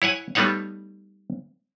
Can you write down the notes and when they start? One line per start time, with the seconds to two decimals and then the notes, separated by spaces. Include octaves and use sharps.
0.02 E4 C#5 F#5 G#5
0.35 G3 A3 B3 D#4 C#5 F#5